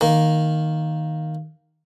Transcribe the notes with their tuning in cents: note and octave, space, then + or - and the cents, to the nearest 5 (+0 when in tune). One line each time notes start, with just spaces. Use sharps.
D#3 +0 A#3 +0